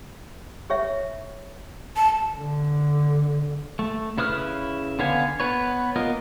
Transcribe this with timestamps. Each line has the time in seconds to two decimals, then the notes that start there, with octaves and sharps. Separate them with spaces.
0.70 G4 C#5 E5
1.97 A5
2.36 D3
3.79 A3
4.18 C#3 E4 B4 D#6 F6
4.99 D3 B3 F5 G#5
5.40 B3 B4 C#5
5.96 A#3 B3 F4 A#4 D#5